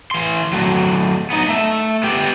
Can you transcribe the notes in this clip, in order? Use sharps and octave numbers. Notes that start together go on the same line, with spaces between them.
E3 C6
F#3 A3
B3 D#4
A3 E5
B3 G4